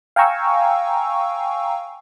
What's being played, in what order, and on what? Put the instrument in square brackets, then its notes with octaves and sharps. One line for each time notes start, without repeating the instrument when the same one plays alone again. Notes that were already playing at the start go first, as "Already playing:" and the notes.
[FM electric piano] F5 G5 G#5 A#5 C#6 E6